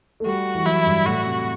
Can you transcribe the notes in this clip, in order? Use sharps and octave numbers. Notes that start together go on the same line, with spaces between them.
A3
G3 F#4
E3
F#3 E4
G2
A2 F#4
C3